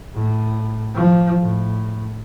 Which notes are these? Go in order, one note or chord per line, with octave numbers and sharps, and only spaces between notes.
A2
F3
A2